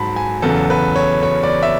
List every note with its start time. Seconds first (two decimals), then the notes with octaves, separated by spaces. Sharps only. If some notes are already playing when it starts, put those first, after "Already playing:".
Already playing: G#2 F#3 A5 B5
0.16 G#5
0.42 E2 C#3 F#3 A4
0.70 B4
0.96 C#5
1.23 C#5
1.43 D5
1.63 E5